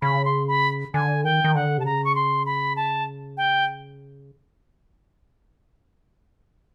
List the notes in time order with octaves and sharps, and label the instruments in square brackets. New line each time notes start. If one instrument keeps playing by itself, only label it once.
[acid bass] C#3 [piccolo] B5
[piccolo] C6
B5
[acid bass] D3 [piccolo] G#5
[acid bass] D#3 [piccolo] G5
[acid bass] D#3
[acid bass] D3 [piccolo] F#5
[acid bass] C3 [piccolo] A5
[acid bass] C#3 [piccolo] A#5
[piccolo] C#6
C6
B5
A5
G5